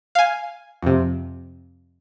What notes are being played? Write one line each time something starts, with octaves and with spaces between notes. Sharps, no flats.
F5 G#5
F2 C3